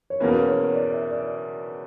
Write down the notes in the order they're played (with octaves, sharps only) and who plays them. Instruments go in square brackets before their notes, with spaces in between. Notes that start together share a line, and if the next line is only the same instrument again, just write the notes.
[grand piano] C#5
[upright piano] E2 B2 A#3 C#4 [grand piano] B4
[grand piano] B4
C#5
D5
E5
D5